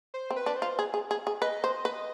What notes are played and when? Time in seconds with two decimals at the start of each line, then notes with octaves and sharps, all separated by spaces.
0.14 C5
0.30 C4
0.36 B4
0.46 D4
0.56 C5
0.62 F4
0.79 G#4
0.94 G#4
1.11 G#4
1.27 G#4
1.42 B4 D#5
1.64 C5
1.85 B4